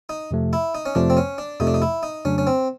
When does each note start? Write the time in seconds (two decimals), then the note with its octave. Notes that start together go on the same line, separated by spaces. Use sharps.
0.09 D#4
0.31 F2 C3 F3 A3
0.53 E4
0.75 D#4
0.86 C#4
0.95 F2 C3 F3 A3 D4
1.10 C4
1.17 C#4
1.38 D4
1.60 F2 C3 F3 A3 D#4
1.67 D4
1.74 D#4
1.82 E4
2.03 D#4
2.25 F2 C#3 F#3 A3 C#4 D4
2.38 C#4
2.47 C4